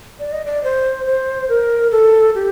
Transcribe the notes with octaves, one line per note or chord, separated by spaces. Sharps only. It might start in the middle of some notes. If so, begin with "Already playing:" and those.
D5
D#5
D5
C5
C5
A#4
A4
G4